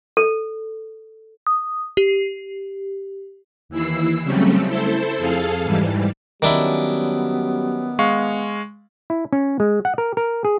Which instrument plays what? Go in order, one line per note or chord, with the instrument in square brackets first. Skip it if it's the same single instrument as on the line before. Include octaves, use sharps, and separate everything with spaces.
[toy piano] A4
[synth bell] D#6
G4
[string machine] D#2 E3 E4 E6 C7
C#3 F#3 G3 A3 C4 C#4
E4 A4 C5
F2 G#4 A4 F5 A5
G#2 E3 G3
[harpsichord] D#3 D4 E4 [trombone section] F#3 G3 C#4 [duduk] B3
[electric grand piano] G#3 F5 C#6
[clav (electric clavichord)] E4
C#4
G#3
F#5
A#4
A#4
G#4